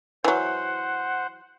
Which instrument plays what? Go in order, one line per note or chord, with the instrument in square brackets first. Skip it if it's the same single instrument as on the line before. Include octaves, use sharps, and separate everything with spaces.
[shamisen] E3 F#3 [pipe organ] C5 F#5